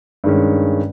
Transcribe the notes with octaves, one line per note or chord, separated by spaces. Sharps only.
G2 D#3 G#3 C#4